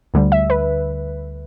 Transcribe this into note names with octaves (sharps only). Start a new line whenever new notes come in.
D2 D3 G3
E5
B4